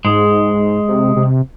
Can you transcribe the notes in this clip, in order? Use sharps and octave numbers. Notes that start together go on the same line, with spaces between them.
G#2 G#3
C3
C3